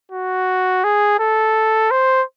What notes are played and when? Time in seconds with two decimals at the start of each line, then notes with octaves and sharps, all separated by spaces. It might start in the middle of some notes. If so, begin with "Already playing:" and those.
0.12 F#4
0.84 G#4
1.19 A4
1.91 C5